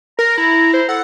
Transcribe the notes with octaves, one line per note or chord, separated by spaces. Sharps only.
A#4 A#5
E4 A#5
C5
A4 F#5